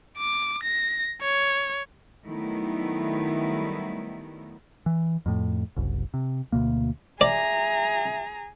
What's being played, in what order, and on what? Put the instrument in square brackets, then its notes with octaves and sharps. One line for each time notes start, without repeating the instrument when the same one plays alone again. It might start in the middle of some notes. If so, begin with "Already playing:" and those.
[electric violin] D6
A#6
C#5
[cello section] D#3 F#3 G3 A3 B3 E4
[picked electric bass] E3
F2 A2
F#1 C2
C3
D2 B2 A#3
[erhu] G#4 [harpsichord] D5 [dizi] E5 [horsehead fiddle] A#5